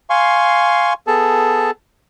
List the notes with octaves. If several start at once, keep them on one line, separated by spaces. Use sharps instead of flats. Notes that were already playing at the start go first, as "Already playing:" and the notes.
F5 G#5 C6 C#6
B3 G#4 A4 A5